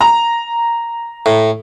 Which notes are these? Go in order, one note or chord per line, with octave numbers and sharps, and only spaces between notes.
A#5
A2